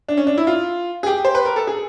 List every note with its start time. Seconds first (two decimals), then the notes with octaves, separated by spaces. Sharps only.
0.09 D4
0.17 C#4
0.27 D4
0.38 E4
0.47 F4
1.03 G#4
1.06 G4
1.25 C5
1.35 B4
1.45 A#4
1.56 A4
1.67 G#4